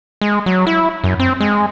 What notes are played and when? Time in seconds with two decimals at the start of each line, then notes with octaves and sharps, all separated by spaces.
0.21 G#3
0.46 F#3
0.67 E4
1.04 F#2
1.20 C4
1.41 G#3